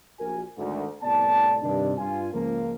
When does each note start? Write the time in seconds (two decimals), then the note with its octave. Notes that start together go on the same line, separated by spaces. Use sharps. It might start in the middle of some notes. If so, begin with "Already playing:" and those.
0.20 A#1 F#4 A#4 G#5
0.58 G#1 D2
1.02 C2 A2 B3 D5 A5
1.63 G2 C3 D#3 D4
1.98 G2 F4 G#5
2.33 C#2 F3 A#3